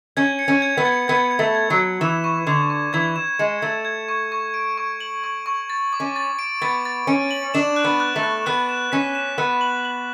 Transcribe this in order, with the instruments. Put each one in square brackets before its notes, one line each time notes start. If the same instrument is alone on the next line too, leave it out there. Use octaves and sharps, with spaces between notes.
[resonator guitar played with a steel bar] C#4 [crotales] G#6
[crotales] C#7
[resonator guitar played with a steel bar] C#4
[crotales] G#6
[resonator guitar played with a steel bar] B3
[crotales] G#6
[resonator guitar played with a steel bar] B3 [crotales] G#6
[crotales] G#6
[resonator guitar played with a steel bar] A3
[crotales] G#6
[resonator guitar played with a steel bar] F#3
[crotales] G#6
[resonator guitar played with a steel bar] E3 [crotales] E7
[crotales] C#6
[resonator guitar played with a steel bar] D3 [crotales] G#6
[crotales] C#6
[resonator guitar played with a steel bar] E3 [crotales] G#6
[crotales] E7
[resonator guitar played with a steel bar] G#3 [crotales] C#7
[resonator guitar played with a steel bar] A3 [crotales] G#6
[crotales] G#6
C#6
C#6
D7
C#6
F#7
C#6
C#6
A6
D6
[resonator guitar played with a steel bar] C#4
[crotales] A6
D7
[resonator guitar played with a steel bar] B3 [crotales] A6
[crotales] A6
[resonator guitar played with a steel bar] C#4 [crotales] D7
[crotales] F#7
[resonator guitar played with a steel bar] D4 [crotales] E7
[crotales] F#6
[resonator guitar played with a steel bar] B3
[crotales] F#6
[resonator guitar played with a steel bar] A3
[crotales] F#6
[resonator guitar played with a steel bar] B3 [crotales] F#6
[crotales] E7
[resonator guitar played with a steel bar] C#4 [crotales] B6
[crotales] E7
[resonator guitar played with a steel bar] B3 [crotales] F#6
[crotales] F#7
F#7